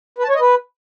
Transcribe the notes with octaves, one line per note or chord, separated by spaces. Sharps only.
B4
A5
C#5
D#5
B4